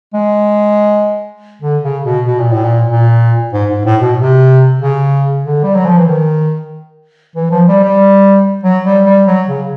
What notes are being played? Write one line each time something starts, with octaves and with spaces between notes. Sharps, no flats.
G#3
D3
C#3
B2
B2
A#2
A2
A#2
A#2
G#2
G#2
A2
B2
C3
C#3
D3
G3
F#3
F3
E3
D#3
E3
F3
G3
G3
F#3
G3
G3
F#3
C#3